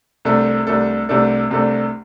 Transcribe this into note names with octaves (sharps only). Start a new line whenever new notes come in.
C2 C3 A3 D4 A4
C2 C3 A3 D4 A4
C2 C3 A3 D4 A4
C2 C3 A3 D4 A4